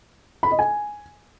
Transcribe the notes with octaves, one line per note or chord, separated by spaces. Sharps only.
B5
D#5
G#5